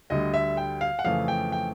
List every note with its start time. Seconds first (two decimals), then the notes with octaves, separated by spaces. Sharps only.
0.10 D2 D3 G3 D#5
0.34 E5
0.57 G5
0.81 F5
0.99 F#5
1.05 F2 C#3 E3 A3 F5
1.28 G5
1.52 G5